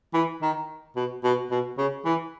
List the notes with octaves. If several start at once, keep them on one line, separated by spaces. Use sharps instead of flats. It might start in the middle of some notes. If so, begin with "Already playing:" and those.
E3
D#3
B2
B2
B2
C#3
E3